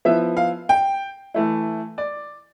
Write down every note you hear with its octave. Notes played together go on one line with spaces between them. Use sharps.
F3 B3 E4 E5
F5
G5
E3 A3 E4
D5